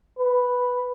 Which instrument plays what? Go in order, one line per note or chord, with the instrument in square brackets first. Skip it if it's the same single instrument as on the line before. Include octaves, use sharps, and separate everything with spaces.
[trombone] B4